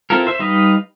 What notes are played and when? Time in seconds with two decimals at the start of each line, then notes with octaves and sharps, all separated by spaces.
0.10 C4 E4 F4 A4 A#4
0.27 C5 E5
0.39 G3 D#4 B4 D#5 F5